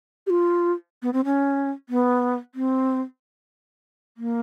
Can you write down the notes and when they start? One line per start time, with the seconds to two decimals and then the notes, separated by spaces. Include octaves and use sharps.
0.27 G4
0.30 F4
1.02 B3
1.13 C4
1.25 C#4
1.89 B3
2.55 C4
4.17 A#3